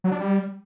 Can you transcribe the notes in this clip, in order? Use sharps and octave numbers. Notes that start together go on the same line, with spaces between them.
F#3
D4
G3